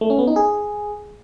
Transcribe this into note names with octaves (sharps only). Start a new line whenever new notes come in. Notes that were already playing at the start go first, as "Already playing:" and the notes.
A3
C#4
B3
D#4
G#4